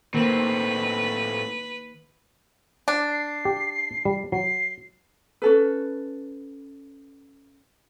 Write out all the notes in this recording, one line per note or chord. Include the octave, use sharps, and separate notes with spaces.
A2 D#3 A#3 C4 A#4 B4
D4
C7
G4
G3
F#3 C7
C#4 A4 B4